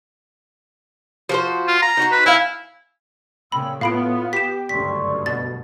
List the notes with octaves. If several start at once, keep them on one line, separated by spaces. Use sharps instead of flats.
F3 F#4 C5
F4
A#5
D#4 F#4 C5
B4
E4 F5 G#5
A#2 C#3 G5 B5 E6
A2 B3 F4 F5 B5 D7
G4 B6 E7
F#1 D2 G2 D5 C6 C#6 B6
B2 A6